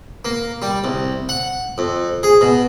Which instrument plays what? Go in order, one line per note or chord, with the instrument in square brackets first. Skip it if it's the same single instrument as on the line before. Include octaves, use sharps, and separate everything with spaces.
[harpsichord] A#3
G3
C2
F#5
F2
G#4
B2